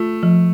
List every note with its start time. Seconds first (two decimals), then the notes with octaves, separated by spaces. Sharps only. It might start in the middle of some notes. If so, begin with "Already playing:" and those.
Already playing: A3 F4
0.23 F3